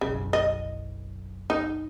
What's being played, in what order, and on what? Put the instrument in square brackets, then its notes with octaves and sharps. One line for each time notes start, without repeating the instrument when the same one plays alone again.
[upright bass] F#1 B1 [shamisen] C#3
[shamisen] D#5
D#4